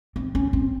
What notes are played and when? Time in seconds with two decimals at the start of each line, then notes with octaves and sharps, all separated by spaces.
0.16 C4
0.35 C#4
0.53 C4